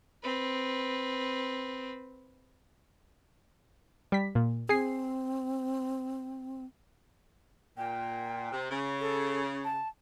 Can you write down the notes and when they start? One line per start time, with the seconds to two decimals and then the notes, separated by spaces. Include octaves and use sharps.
0.22 C4 B4
4.12 G3 B6
4.35 A#2
4.69 C4 G#4 G#5 C7
7.77 A#2 G5
8.52 C3
8.71 C#3
9.00 A4
9.64 A5